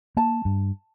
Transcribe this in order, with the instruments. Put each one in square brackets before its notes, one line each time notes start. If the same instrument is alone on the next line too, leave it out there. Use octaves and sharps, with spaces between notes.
[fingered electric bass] A#3 [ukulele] A5
[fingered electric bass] G2